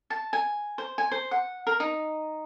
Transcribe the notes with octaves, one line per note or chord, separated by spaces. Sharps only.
A5
G#5
C5
G#5
C5
F#5
A#4
D#4